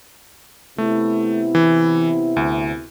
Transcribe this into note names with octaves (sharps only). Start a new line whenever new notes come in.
C3 A3 B3 E4
E3
D2